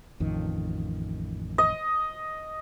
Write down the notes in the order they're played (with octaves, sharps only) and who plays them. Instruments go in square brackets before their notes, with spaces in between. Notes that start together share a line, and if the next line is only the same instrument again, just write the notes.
[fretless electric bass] A1 F2 D#3
[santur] D#5